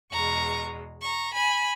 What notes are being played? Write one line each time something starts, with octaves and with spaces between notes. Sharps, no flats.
E2 B2 G#3 A#5 C#6
A#5 C#6
G#5 B5